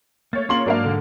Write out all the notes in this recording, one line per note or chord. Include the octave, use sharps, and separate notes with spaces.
A3 A#3 C#5 A6
A#3 C#4 F4 G#4 C6 F#7
G#2 F#3 G#3 A#3 D4 A#4 F5
D3